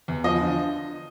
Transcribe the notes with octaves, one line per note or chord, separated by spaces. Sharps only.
E2
F3 D#5
D3